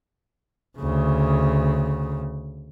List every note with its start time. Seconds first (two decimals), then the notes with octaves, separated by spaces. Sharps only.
0.78 D2 C#3